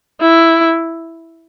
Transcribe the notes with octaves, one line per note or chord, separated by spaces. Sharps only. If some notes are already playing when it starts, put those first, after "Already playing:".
E4